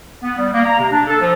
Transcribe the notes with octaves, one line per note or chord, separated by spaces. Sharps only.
B3
G3
A#3
A#5
C3
D4
A4
F3